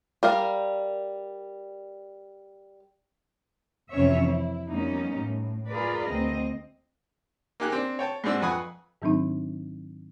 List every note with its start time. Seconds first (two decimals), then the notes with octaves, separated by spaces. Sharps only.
0.23 G3 A#4 F5
3.92 F2 C3 E3 C#4 C#5 E5
4.26 E4
4.70 F2 G3 A#3 B3 C#4 D#4
5.16 A2
5.70 F4 G#4 A#4 B4 D5
6.08 D2 C4 D#5
7.60 A#3 D#4 G4 G#5 F#6
7.72 C4 D4
7.99 C#5 G5 A5
8.24 G#2 G3 C4 D4 F#4 E6
8.42 F2 B4 F#5 G#5 C#6 D#6
9.02 G#2 D#3 F#3 C4 D4 D#4